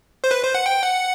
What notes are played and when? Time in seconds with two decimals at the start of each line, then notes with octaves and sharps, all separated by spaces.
0.24 C5
0.31 B4
0.43 C5
0.55 F#5
0.66 G5
0.83 F#5